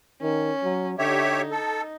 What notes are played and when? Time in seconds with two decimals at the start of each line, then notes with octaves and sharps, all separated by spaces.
0.22 D#3 C#4
0.64 F#3
0.99 D3 D#4 G4 C#5 E5
1.51 A4